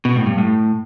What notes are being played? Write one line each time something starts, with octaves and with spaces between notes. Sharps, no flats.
B2
A2
G2
A2